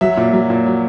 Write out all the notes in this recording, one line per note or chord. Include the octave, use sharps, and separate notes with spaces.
F#3 E5
A#2
F#3
A#2
F#3